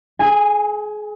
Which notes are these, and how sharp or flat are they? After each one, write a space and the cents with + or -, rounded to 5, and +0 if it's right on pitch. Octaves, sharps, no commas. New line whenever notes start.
G#4 +30 G#5 -15